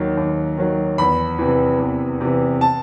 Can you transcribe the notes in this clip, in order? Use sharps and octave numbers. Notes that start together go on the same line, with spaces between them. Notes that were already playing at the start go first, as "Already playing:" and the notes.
Already playing: D#2 D#3 F#3
D#2
D#3 F#3
E2 B5
C3 E3
E2
C3 E3
A5